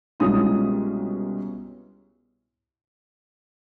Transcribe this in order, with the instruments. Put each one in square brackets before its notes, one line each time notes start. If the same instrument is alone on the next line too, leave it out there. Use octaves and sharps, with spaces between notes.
[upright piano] C2 B2 G#3 C#4 F4 D#6